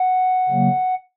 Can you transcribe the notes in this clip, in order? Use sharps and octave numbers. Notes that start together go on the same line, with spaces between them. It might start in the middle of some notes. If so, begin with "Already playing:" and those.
Already playing: F#5
C#3 F#3 A#3